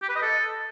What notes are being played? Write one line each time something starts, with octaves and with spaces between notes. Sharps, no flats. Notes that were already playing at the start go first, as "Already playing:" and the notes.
G4
B4
D#5
A4